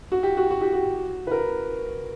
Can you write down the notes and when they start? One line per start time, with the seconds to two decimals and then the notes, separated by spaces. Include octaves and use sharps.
0.12 F#4
0.23 G4
0.37 F#4
0.51 F#4
0.61 G4
0.73 F#4
1.27 B4
1.31 A#4